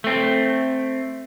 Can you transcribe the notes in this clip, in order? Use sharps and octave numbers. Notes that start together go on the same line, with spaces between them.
A3 C4